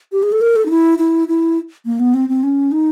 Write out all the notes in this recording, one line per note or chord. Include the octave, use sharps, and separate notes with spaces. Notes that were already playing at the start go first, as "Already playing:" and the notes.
G4
G#4
A4
A#4
A4
D#4
E4
E4
E4
A#3
B3
C4
C4
C#4
D#4